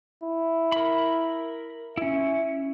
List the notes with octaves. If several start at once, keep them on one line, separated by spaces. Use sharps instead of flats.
E4
A#4 B5
C#4 E4 E5